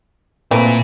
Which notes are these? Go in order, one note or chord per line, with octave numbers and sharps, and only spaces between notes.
A#2 E3 A3 A#3 C4 A#4